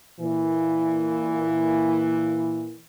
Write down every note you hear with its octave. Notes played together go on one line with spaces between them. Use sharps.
A#2 E3